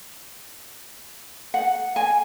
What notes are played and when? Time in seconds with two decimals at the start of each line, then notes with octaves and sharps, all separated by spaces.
1.54 F#5
1.96 G#5